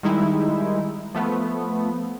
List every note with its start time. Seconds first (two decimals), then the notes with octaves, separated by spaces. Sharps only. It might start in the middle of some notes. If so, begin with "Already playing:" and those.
0.03 D#3 G3 G#3 D#4 E4
1.15 F3 A3 B3